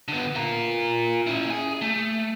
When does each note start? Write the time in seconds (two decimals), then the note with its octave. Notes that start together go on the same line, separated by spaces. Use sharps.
0.08 D3 B3
0.35 F4 A#4
1.27 C#4 E4
1.50 G#4 G#5
1.82 A3